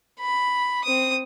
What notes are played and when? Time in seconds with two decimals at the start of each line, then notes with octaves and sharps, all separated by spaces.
0.20 B5
0.84 C4 D#6